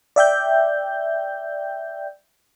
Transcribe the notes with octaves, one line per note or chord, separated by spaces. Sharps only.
D5 E5 G5 G6